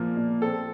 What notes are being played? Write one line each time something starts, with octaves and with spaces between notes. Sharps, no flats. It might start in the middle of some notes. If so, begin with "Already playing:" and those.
Already playing: A#2 F3 A#3
A#2
C4 A4